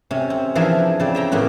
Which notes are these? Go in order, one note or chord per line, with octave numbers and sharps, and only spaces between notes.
C3 C#4
C4
E3 F3 D4 G#4 A#4 E5
C#3 C4 D5
E5 G5 A#5
A2 A#3 B3 F#4